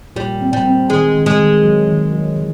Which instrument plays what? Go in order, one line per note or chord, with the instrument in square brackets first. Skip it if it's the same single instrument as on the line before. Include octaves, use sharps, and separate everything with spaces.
[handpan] A#2 [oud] G3
[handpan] C4
[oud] G3
[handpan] C4
[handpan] D#3 [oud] G#3
[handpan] D#3
[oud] G#3
[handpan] D#3
F#3
D#3
F#3
E3